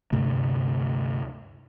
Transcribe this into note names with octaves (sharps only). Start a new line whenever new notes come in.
D2 G2 C3 A3